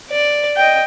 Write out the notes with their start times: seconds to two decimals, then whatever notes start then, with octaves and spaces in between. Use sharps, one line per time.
0.11 D5
0.57 D#5 G5